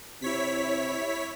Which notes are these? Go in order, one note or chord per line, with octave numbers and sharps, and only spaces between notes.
C3 E4 C#5 B6